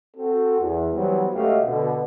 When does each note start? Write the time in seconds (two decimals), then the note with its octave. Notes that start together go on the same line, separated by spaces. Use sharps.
0.17 C4 F#4 A4
0.60 E2
0.93 E3 F#3 G3 B3 C4
1.34 C#2 A3 F#4 G4 D#5 F5
1.66 B2 D3